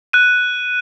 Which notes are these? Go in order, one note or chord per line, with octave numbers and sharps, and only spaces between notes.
F#6 D#7